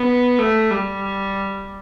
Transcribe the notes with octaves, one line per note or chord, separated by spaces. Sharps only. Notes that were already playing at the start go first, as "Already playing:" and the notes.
Already playing: B3
A3
G3